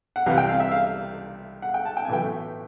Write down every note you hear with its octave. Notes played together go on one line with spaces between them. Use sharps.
F#5
C2 C3 E3 F5
G5
F5
E5
F5
F#5
G5
A5
G5
G#5
B1 A2 E3 A3 G5